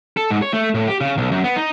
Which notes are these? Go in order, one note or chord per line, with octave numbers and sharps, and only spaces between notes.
A4
G#2
C#5
A3
A2
G4
C#3
B1
F#2
B3
D#4